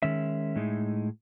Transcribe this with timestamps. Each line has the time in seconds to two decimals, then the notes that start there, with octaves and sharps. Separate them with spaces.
0.03 D#3 G#3 C#4 E5
0.56 A2 G#3 D#4